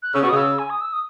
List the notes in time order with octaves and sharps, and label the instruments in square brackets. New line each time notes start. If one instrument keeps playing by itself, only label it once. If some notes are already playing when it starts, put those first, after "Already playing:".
[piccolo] F#6
[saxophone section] C#3 [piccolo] E6
[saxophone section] B2 [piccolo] C#6
[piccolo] D#6
[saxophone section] C#3 [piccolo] E6
[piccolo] G#5
D#6
E6
D#6